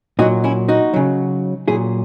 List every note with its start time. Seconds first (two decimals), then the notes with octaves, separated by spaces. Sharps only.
0.19 A#2 F#3 D#4 F#4
0.44 C#4 E4
0.68 D#4 F#4
0.94 C#3 F#3
1.68 A#2 F#3 E4 G#4